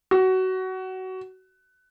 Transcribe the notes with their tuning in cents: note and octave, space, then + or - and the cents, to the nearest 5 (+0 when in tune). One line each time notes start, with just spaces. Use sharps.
F#4 +20